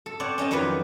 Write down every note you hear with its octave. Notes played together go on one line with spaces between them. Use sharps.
A4
C4 C#5 D5 F#5
C#4 D#5 G5 A5
F2 D#3 F#3 D#4 B4 D5